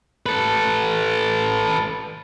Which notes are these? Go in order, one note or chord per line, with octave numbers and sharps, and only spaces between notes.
A4 B4